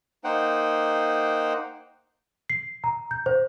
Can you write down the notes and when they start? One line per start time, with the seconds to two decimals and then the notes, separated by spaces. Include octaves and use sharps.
0.24 A#3 D#4 C5 F#5 G5
2.50 C7
2.84 A#5
3.11 G6
3.26 C5